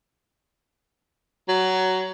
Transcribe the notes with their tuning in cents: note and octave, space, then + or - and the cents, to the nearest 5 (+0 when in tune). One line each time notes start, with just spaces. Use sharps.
F#3 +15